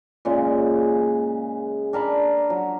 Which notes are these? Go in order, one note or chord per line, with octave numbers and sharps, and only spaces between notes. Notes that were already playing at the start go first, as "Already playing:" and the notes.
A#2 C#3 G#3
D4 A#4 A5 B5
F#3